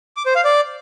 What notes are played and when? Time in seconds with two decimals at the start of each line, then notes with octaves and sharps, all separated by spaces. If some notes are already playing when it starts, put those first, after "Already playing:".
0.17 D6
0.26 C5
0.35 F5
0.45 D5